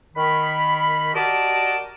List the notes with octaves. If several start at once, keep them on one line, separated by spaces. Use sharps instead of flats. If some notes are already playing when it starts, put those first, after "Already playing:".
D#3 B5
F#4 G4 A#4 D5 D#5 A5